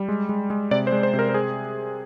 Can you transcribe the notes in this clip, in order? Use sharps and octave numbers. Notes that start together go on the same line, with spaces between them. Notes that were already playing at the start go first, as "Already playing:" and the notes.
Already playing: G3
G#3
G#3
G#3
C3 D5
C5
G#3
C5
C3
A#4
A#4
G#4